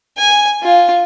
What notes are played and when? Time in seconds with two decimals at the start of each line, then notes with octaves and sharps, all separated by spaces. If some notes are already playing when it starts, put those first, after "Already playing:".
0.17 G#5
0.63 F4